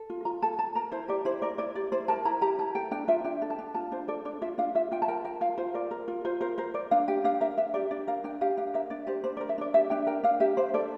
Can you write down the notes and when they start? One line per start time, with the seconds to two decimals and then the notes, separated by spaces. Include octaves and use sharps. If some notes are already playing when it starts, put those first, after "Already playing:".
Already playing: A4
0.10 F4
0.25 F4 A#5
0.42 A4 A5
0.59 A4 A5
0.75 A#4 A#5
0.92 E4 C5
1.08 G4 D5
1.25 E4 C5
1.42 A#4 D5
1.58 E4 D5
1.75 G4 D5
1.92 E4 C5
2.08 A#4 A5
2.25 E4 A#5
2.41 G4 A#5
2.58 E4 A5
2.75 A4 G5
2.91 D4 G5
3.08 F4 E5
3.24 D4 G5
3.42 A4
3.50 A5
3.59 D4
3.74 F4 A5
3.91 D4 C5
4.08 A4 D5
4.25 D4 D5
4.42 F4 E5
4.58 D4 F5
4.75 F4 E5
4.92 F4 G5
5.02 A5
5.08 A#4 G5
5.24 A#4 G5
5.41 F4 F5
5.58 F4 C5
5.74 A#4 D5
5.91 A#4
6.08 F4
6.25 F4 C5
6.41 A#4 C5
6.58 A#4 C5
6.74 A#4 D5
6.91 D4 F5
7.08 G4 G5
7.24 D4 F5
7.40 A#4 E5
7.57 D4 E5
7.74 G4 D5
7.91 D4 D5
8.07 A#4 F5
8.24 D4 G5
8.41 G4 F5
8.57 D4 F5
8.74 A#4 E5
8.90 D4 D5
9.07 G4 C5
9.24 D4 C5
9.37 D5
9.41 A#4
9.49 E5
9.58 D4 D5
9.74 G4 E5
9.90 D4 G5
10.07 A#4 G5
10.23 D4 F5
10.40 G4 E5
10.57 D4 C5
10.74 A4 D5